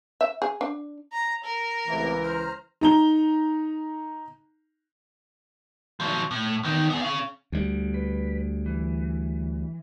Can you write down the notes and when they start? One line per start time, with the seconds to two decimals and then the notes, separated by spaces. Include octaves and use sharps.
0.21 E5
0.42 G#4
0.61 D4
1.12 A#5
1.44 A#4
1.88 C#2 A2 C3 E3 A#3
2.23 C5 A#5 F6
2.81 D#4 A#5 G7
6.00 F3 F#3
6.31 A2
6.63 E2 D#3
6.90 B3 G#5
7.01 C#4 F5
7.52 D2 G3
7.94 B4
8.66 E3